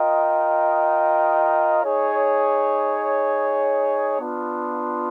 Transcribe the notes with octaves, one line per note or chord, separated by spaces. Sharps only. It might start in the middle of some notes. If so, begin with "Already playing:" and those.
Already playing: F4 A#4 D#5 G5
D#4 G#4 C#5
B3 D4 F4